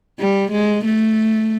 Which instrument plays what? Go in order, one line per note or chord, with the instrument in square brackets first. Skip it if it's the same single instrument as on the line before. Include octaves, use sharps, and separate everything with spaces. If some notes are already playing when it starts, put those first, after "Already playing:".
[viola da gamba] G3
G#3
A3